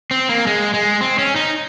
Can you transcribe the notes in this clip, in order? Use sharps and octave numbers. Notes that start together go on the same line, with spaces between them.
C4
A#3
G#3
G#3
C4
C#4
D#4